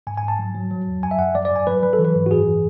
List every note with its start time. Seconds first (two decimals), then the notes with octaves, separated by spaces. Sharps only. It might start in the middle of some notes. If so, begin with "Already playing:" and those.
0.07 G#2 G#5
0.17 G#5
0.23 G#2
0.28 A5
0.39 F#3
0.55 F#3
0.71 F#3
0.87 E2
1.03 F#2 G#5
1.11 E5
1.19 F#2 F#5
1.35 F#3 D5
1.45 D5
1.51 G#2 G#5
1.67 F#3 B4
1.82 F#3 B4
1.93 A4
1.99 E3
2.05 B4
2.15 G#2
2.26 F#4
2.31 F#2 G#4
2.47 E3